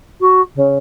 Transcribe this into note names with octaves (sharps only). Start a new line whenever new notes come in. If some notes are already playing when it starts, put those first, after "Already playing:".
F#4
C#3